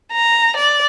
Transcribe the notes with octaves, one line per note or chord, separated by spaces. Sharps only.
A#5
D5